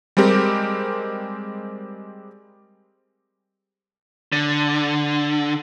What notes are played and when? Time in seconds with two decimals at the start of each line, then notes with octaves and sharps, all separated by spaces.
0.17 G3 G#3 C4 G4 A#4
4.33 D3